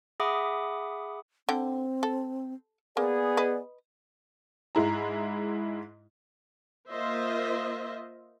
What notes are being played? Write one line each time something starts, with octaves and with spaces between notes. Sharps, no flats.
G#4 E5 F#5 B5 D6 D#6
D3 C4 G5
A4
A#3 B3 G#4 D5
B4 D#5
G#2 G#3 E4 A#5
A#3 F4 C5 D#5 E5